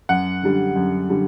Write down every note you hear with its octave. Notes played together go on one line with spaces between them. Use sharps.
F#2 F#5
D3 G3
F#2
D3 G3